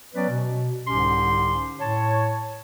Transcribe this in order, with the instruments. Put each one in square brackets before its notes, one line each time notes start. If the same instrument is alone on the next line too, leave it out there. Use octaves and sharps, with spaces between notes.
[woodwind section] F#3 B3 C#4 B4 D5
B2
C2 G#2 D3 C#4 G4 C6
A2 C#5 A5